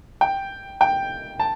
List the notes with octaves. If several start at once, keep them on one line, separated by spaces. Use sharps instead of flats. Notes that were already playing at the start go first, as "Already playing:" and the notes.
G5
G5
A5